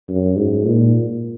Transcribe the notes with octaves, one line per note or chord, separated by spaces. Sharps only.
F#2
G#2
A#2